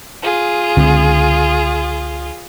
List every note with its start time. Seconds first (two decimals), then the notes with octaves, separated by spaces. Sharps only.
0.23 F4 G#4
0.77 C#2 D3 C4